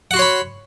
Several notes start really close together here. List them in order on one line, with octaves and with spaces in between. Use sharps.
F#5 F#4 C6 C#5 B5